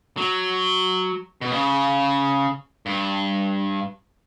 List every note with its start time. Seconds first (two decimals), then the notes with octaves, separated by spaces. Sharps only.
0.17 F#3
1.41 B2
1.52 C#3
2.86 G2